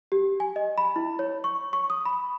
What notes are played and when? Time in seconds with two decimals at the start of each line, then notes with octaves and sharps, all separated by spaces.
0.12 G4
0.40 G#5
0.56 D#5
0.78 B5
0.96 E4
1.19 C#5
1.44 C#6
1.73 C#6
1.90 D#6
2.05 B5